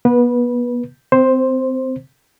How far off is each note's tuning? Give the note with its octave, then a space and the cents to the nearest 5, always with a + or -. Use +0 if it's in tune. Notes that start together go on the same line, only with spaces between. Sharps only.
B3 -35 B4 -20
C4 -25 C5 +5